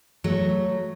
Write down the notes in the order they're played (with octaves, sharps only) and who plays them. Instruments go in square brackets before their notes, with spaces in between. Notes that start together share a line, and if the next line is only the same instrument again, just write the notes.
[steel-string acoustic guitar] F#3 A3